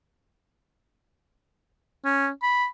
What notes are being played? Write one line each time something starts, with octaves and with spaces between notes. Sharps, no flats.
C#4
B5